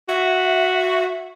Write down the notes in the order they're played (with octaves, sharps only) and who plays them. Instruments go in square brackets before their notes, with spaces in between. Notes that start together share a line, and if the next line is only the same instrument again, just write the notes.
[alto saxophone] F#4 [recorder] E5